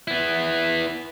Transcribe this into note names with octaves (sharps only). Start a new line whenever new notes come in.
B3 E4